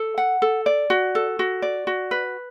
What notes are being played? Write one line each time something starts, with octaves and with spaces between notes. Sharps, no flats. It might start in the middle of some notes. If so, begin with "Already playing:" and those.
Already playing: A4
F#5
A4
D5
F#4
A4
F#4
D5
F#4
B4